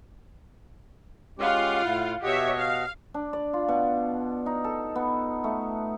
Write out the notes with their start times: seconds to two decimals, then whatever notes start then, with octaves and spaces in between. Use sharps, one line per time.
1.39 G#3 C#4 F4 G4 F5 F#5
1.85 A2 E4
2.23 B2 G4 C#5 D#5 E5 F#5
2.57 F5
3.14 D4
3.33 D5
3.53 F4
3.68 B2
4.46 D#4
4.64 A4
4.95 B3
5.44 A3